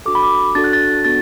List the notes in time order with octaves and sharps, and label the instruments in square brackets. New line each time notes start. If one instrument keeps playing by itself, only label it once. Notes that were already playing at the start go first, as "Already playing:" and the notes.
[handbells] D4 F#4 A4 D6
B5
D6
D4 F#4 A4 A6
F#6
A6
B3 D4 F#4 A4 A6